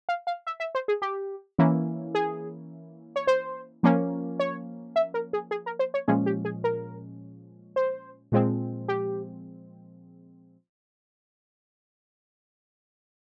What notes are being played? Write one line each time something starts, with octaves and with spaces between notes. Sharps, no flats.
F5
F5
E5
E5
C5
G#4
G4
E3 A#3 C#4 E4
G#4
C#5
C5
F3 A#3 C#4
C#5
E5
A#4
G#4
G#4
A#4
C5
C#5
A#2 F3 G#3 C#4 G#4
G4
G#4
A#4
C5
A#2 F3 G#3 C4
G4